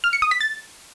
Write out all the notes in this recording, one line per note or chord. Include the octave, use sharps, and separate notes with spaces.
F6
C#7
D#6
B6
A6